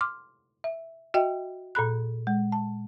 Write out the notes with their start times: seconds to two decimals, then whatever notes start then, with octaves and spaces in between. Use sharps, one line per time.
0.01 C6 D6 F6
0.64 E5
1.14 F#4 D#5 E5 G5
1.75 A#2 A4 B5 F#6
2.27 G#3
2.52 A5